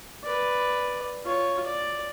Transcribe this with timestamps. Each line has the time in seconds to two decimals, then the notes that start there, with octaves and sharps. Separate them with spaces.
0.24 B4 D5
1.25 F4 C#5
1.66 D5